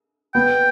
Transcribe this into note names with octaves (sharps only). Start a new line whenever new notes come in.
B3 G5